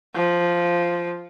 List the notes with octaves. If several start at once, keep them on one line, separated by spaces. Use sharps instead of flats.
F3